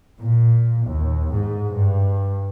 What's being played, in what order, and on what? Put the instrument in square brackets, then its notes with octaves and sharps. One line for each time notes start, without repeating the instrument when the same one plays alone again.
[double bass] A#2
D#2
G#2
G2